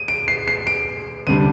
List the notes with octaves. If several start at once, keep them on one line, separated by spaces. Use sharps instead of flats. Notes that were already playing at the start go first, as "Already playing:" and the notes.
Already playing: D#7
D7
C7
C7
D7
D2 C3 G3 D4 D#7